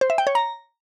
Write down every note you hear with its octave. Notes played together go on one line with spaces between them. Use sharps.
C5
E5
G5
C#5
A#5